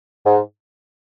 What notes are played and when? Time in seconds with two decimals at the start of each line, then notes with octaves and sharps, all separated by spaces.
0.25 G#2